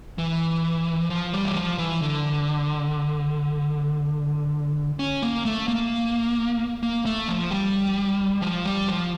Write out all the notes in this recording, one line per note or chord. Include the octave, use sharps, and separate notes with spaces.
E3
F3
G3
E3
F3
E3
D3
C#4
A#3
A3
A#3
A#3
A3
F3
G3
F3
G3
F3